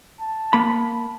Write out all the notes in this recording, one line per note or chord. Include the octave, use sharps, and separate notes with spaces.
A5
A#3 B5